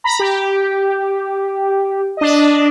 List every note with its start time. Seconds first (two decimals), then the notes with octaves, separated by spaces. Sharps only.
0.04 A#5 B5
0.19 G4
2.17 D4 D#5